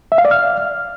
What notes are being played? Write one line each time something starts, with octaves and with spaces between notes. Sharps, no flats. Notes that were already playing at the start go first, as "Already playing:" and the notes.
E5
F5
D5
F6